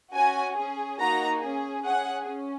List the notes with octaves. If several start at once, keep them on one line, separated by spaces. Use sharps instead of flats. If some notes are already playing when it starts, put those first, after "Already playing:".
C#4 F#4 G#5
C#4 G#4
A#3 D#4 F#4 A#5
C#4 G#4
C#4 G#4 F#5
C#4